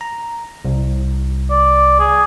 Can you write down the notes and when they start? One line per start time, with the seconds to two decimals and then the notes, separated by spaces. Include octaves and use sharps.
0.01 A#5
0.65 C2
1.50 D5
1.99 G#4